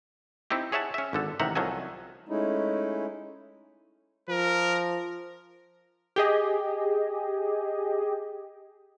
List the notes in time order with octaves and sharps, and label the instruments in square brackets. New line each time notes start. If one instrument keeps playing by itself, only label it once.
[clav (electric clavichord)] C4 D#4 E4 G4
G#4 C#5 E5 F#5 A5
C#4 E5
G#1 D3 A4
A1 C3 D#3 E5 F#5 A#5
C2 F3 F#3 A4 D#5 G#5
[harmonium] G#3 A3 C#4 D#4 E4
[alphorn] F3 [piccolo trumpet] A#4
[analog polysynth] G4 G#4 D#5